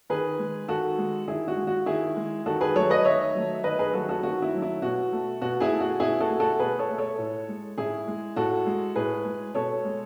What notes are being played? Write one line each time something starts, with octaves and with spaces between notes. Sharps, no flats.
D#3 G#4 B4
G#3
D#3 F#4 A4
G#3
D#3 E4 G#4
F#4
G#3
F#4
D#3 E4 G#4
G#3
D#3 F#4 A4
G#4 B4
F#3 A3 A4 C#5
B4 D#5
D#3 C#5 E5
F#3 A3
D#3 B4 D#5
G#4 B4
F#3 A3 F#4 A4
F#4 A4
D#3 F#4
E4
F#3 A3
E4
B2 F#4
A3
B2 F#4
E4 G#4
A3
F#4
B2 E4 G#4
F#4 A4
A3
F#4 A4
B2 G#4 B4
A4 C#5
A3
A4 C#5
A2
G#3
A2 E4 G#4
G#3
A2 F#4 A4
G#3
A2 G#4 B4
G#3
B2 A4 C#5
G#3